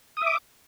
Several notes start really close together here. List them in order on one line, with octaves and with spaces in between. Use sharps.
D#6 E5 D6